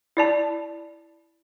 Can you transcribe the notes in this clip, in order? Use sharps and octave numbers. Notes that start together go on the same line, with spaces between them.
E4 D5 A5